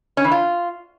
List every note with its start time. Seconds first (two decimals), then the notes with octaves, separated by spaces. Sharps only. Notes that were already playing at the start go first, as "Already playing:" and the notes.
0.17 C#4
0.24 E3
0.31 F4